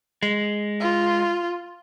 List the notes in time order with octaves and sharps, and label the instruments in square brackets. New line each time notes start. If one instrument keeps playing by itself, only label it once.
[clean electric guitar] G#3
[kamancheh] F4